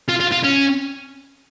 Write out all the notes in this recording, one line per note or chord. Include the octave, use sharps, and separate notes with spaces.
F4
F4
F4
C#4